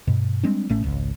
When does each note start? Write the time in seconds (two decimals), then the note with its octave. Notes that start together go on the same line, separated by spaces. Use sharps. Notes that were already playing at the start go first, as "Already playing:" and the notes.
0.07 G2 B2
0.43 G3 G#3 C4 D4
0.69 A1 A2 A3 C#4
0.84 G#1 C#2